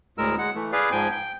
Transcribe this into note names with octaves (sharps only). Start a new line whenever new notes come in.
D2 A2 G#3 A#4 E6
G#3 F#5
E3 A3
G#4 B4 D5 F5
G#2 F3 G5 G#5
G5